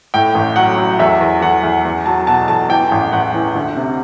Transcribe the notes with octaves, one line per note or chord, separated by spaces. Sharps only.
A2 G5
A1
F#3 F#5
F#3
E2 E5
E2
E2 F#5
E2
E2
F#3 A5
B2 A5
E2 A5
E3 G5
A1
A1 F#5
E3
D2
C3